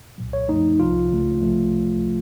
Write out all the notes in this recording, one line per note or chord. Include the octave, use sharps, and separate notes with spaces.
C2 A#2 F#3
C#5
F#2 F3 A3 D#4
C2 C3 F3 F4
C#2 C#3 A3
C2 C3 F3 A3